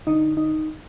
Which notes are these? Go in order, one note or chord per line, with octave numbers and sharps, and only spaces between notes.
D3 D#4
D#4